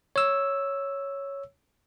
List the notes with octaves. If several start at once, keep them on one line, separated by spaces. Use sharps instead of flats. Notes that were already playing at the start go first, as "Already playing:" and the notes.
C#5 E6